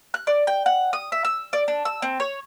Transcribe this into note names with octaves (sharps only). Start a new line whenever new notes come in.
F#6
D5
G5
F#5
D#6
E5
E6
D5
D4
E6
C4
C#5